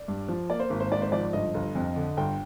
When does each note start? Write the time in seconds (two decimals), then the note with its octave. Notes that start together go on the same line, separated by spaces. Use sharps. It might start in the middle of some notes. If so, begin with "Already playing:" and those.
Already playing: D5
0.08 G2
0.28 F3
0.50 A#3 D5
0.60 C5
0.70 G#1
0.80 C5
0.92 G#2 D5
1.02 C5
1.12 F3 D5
1.33 G1 D#5
1.54 G1
1.75 F2
1.96 D3
2.17 G1 G5